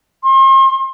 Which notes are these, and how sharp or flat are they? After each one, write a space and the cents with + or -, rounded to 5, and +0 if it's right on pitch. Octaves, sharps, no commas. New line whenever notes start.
C6 +40